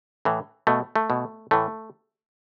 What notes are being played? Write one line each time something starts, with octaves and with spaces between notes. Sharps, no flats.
A2 E3
B2 A3
A3
B2
A2 E3 A3